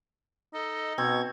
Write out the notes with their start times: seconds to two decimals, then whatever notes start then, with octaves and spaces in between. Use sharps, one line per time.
0.54 D#4 A4 D#5
0.98 B2 C4 C#6 G#6